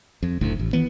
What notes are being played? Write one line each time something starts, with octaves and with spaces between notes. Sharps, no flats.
F2
F#1 D2 A2
A1
D#3 E3 B3